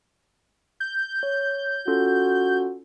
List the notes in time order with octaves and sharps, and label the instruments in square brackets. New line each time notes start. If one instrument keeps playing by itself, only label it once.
[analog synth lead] G6
[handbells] C#5
[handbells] C#4 F4 A4 [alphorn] F#4